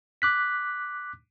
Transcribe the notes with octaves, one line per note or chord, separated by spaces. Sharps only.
D6 F#6 B6